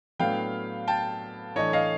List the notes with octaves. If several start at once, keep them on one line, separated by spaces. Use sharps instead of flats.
A2 F#3 B3 D4 F5 G5
G5 A5
A2 E3 A3 D4 C#5 D#5
D#5 F5